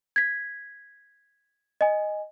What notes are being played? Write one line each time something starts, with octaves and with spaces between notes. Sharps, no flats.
G#6 B6
D#5 G#5